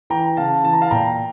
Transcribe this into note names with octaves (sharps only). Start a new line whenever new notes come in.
E3 G5 A#5
C#3 F5 A5
E3 A5
A#5
F5 A5
A#2 G5 A#5